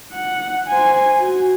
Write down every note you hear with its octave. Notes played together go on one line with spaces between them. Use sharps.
F#5
C5 G#5
F#4